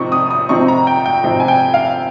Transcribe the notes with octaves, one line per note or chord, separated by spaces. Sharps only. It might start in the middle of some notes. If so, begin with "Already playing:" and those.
Already playing: C3 F3 C4 D#4 C#6
D#6
D#6
C3 F3 C4 D#4 C#6
A#5
G5
G5
C3 F3 C4 D#4
G#5
G5
F5